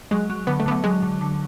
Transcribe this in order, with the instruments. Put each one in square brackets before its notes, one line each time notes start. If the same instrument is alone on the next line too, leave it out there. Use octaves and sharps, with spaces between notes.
[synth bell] F#3 [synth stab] G#3
[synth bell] F#3
[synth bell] D3 [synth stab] B3
[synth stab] A3
[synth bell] D3 [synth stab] B3
[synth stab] A3
[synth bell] F#3 [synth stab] G#3
[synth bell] D3
D3